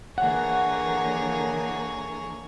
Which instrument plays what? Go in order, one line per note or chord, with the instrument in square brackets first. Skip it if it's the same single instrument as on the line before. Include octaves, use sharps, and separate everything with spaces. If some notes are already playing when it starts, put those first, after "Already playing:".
[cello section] D3 E3 A#3 [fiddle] G#4 C#5 [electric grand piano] F#5